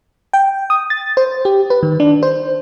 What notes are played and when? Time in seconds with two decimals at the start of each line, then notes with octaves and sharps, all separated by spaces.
0.33 G5
0.70 D#6
0.90 A6
1.17 C5
1.45 G4
1.70 B4
1.83 D#3
2.00 D4
2.23 C5